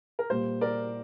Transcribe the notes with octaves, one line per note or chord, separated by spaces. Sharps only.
A#4
A#2 G3 A#3 C5
A#4 D5